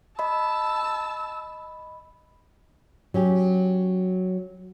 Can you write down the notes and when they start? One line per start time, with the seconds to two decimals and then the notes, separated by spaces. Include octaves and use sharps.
0.19 D#5 A5 B5 E6
3.14 F#3 C#4 G4